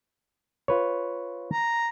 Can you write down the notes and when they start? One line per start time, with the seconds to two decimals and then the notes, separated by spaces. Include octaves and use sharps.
0.68 F4 B4 C#5
1.52 A#5